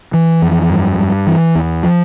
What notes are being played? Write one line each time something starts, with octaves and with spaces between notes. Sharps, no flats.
E3
F2
G2
G2
E3
E2
F3